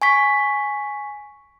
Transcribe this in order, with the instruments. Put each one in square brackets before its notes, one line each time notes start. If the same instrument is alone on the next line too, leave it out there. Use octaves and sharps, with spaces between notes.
[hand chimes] G#5 C#6 B6